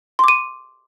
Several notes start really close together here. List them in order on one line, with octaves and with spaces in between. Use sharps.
C6 D6 D#7